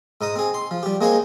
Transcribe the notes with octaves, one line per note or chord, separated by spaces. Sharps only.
G#2 D#4 A#5 D#6
C4 G#4
C6
F3
G3 G4
G#3 A#3 C4 G#4 C5 C#5